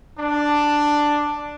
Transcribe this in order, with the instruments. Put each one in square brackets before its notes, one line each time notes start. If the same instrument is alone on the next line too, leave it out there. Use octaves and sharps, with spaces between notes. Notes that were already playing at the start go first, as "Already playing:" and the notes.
[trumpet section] D4